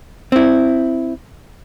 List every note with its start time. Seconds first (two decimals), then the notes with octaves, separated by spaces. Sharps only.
0.32 C4 E4